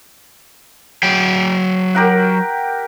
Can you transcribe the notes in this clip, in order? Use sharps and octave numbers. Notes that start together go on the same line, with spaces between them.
F#3 G5
G4 A#4 F#5